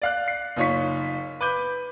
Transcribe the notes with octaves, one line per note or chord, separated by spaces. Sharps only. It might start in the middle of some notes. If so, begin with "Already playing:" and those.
D5 F5 F#6
C7
F#1 D#4 F4 C#5 C#6 B6
B4 D6 G6